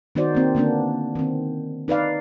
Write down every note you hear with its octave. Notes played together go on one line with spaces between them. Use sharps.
D#3 B3 D#4 F#4 C5 D5
A#3 C4
D3 A#3 B3 D4
D#3 C4
D#4 B4 D5 F5